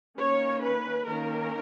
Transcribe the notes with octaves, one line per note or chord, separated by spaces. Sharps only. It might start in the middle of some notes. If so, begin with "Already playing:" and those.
D#3 A#3 C#4 C#5
B4
D#3 A#3 C#4 A#4